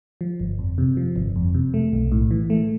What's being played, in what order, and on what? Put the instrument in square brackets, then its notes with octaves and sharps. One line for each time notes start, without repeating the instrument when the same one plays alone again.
[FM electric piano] F3
G1
F2
C3
F3
G1
F2
C3
A3
B1
A2
E3
A3